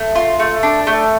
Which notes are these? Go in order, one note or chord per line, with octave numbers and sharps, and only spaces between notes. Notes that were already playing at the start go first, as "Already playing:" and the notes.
Already playing: A3
F4
A3
D4
A3